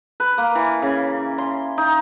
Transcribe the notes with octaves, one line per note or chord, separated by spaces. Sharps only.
B4
A#3
E3
C#3
C6
D#4